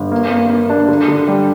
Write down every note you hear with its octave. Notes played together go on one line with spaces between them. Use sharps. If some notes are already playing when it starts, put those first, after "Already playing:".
Already playing: G1
A#3
A#3
A#3
D4
D3
D3
G3